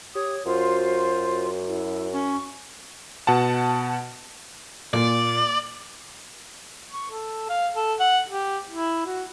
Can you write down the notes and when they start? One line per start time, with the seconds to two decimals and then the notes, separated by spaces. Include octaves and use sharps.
0.15 G4 C#5 D#6
0.46 F#2 F4 F#4 C5
1.67 E4
2.13 C#4 C#6
3.27 B2 F#5 A5
4.93 A#2 D5
6.92 C#6
7.11 A4
7.49 F5
7.75 A4
8.00 F#5
8.29 G4
8.69 E4
9.06 F#4